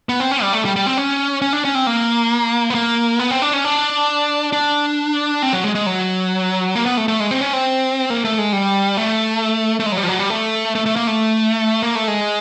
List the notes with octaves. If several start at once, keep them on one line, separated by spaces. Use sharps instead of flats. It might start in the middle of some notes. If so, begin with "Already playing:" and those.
B3
C4
C#4
G3
A3
G3
G3
C4
C#4
C#4
D4
C#4
C4
A#3
B3
A#3
B3
C4
D4
C#4
D4
D4
C4
F#3
G#3
G#3
F#3
A#3
B3
A3
A3
G#3
C4
C#4
C4
A#3
A3
G#3
G3
A3
A3
G#3
F#3
G3
F3
F#3
G3
A3
A3
A3
A#3
A3
A#3
A3
G#3